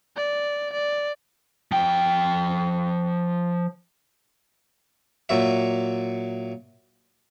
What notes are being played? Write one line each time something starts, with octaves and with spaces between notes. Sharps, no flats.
D5
D5
F3 G5
A#2 F#3 E5